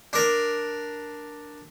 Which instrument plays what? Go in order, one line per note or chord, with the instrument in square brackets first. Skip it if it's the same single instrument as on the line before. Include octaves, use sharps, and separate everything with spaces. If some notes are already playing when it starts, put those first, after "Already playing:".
[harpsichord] D4 A#4